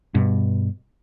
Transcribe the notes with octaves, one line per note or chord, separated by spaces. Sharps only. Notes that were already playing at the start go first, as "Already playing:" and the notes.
G2 B2